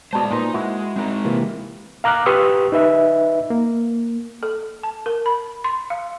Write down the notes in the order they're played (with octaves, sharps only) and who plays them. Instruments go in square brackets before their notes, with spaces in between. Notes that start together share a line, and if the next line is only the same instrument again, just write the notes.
[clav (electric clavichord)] B2 A5 [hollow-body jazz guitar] G#3 [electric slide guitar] C5 D5
[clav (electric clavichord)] A#2 [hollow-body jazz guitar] A#3 B4 C5 [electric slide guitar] D#4
[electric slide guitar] G#3 [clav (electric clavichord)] E4 F#4
[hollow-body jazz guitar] G#3 A#4 [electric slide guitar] C4 D#4
[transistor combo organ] C3 E3 A#3
[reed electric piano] F5 A#5 D6 F6 F#6
G4 B4 C6 C#6 D#6 E6
D#4 B4 E5
A#3
[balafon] A4
A5
A#4
B5
C6
F5